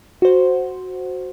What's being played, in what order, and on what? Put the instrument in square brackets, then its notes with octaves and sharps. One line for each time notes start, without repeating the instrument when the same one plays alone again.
[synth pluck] F#4 C5